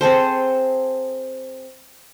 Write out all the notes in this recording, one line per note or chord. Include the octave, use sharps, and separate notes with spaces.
C4 G#4 A4 C5